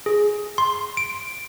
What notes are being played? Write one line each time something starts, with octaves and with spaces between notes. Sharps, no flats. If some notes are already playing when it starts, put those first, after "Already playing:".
G#4
C6
D7